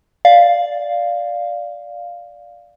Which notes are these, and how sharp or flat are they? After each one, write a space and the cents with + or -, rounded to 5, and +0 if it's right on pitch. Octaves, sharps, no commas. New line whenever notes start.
D5 +0 F5 +0